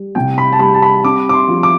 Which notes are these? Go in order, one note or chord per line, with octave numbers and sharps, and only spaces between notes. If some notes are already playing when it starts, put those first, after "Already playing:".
Already playing: G3
C2 G5
B5
A5
G3 B5
A5
B5
C4 D6
D6
C6
F3
D6